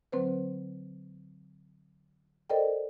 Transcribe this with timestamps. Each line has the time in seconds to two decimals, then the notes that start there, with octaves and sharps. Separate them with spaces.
0.12 D3 F#3 C4 B4 C5
2.50 A4 A#4 C5 D5 D#5 G5